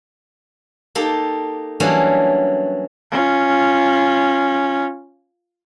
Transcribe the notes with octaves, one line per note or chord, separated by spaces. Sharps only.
A#3 D#4 G4 A4
E3 F#3 G3 A#3 C#4 D4
C#4 F4